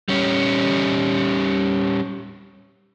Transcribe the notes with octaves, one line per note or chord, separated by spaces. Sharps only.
G3 C#4